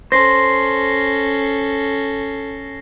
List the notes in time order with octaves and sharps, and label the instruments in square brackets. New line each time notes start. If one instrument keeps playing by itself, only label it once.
[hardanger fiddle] C#4 A4 [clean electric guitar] C5 [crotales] A#6 C7